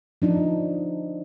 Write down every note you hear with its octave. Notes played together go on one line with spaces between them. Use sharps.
F3 D4 D#4